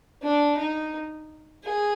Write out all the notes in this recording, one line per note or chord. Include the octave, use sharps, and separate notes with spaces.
D4
D#4
G#4